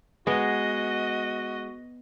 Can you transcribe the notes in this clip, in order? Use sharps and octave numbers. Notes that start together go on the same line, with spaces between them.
G#3 B3 F#4 D#5